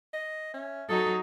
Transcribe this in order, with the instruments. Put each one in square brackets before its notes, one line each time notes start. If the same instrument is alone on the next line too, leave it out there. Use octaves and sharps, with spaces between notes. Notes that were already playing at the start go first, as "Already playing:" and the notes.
[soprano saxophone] D#5
[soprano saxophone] C#4 [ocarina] E5
[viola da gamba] F#3 D#4 [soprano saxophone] A4 [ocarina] D#6